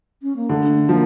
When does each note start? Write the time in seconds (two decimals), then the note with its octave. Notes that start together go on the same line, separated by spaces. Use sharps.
0.22 C#4
0.36 A#3
0.49 D3 A3
0.89 F3 A#3